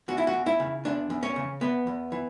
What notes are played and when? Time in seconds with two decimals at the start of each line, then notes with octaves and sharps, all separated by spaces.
0.08 E2 F#4
0.18 E4
0.27 F#4
0.33 E2
0.46 E4
0.60 C#3
0.85 E2 D4
1.10 E2
1.23 C#4
1.36 C#3
1.61 E2 B3
1.87 E2
2.12 E3